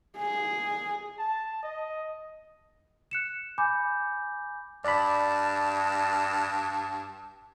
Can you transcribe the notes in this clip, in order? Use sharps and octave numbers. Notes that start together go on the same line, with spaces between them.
G#4
A5
D#5
F#6 C#7 E7
G#5 B5 D6 G6
G2 D5 A5 B5